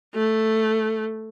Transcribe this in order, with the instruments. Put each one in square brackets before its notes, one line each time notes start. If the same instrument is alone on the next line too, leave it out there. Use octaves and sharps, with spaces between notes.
[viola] A3